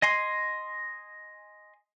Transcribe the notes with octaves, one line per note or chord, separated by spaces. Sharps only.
D#5 G#5 C6